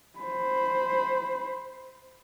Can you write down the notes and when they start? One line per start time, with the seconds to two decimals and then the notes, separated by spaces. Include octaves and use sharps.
0.19 C5 B5